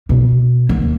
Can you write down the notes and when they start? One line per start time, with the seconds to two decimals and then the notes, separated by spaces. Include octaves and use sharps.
0.09 B2
0.69 D#2